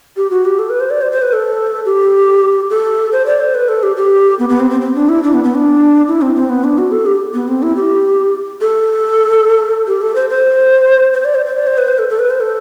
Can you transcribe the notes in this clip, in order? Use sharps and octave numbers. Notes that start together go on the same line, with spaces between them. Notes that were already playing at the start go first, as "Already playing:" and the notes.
G4
F#4
G4
A4
B4
C5
D5
C5
C5
B4
A4
G4
A4
C5
D5
C5
B4
A4
G4
G4
B3
B3
C4
C4
C4
D4
E4
D4
B3
B3
D4
E4
C4
C4
B3
D4
F#4
A4
G4
B3
C4
E4
G4
A4
G4
A4
C5
C5
C5
D5
C5
C5
D5
C5
B4
C5
A4
A4
B4
C5
A4